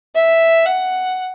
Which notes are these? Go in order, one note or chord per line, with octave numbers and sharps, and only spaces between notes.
E5
F#5